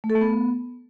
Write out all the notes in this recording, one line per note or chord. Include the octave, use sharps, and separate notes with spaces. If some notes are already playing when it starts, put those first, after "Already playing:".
A3
A4
A3
B3